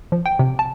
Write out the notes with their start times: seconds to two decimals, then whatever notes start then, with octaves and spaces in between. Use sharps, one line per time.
0.12 F3
0.26 G5
0.39 C3
0.59 A5